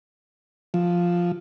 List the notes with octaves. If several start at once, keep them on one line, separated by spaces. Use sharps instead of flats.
F3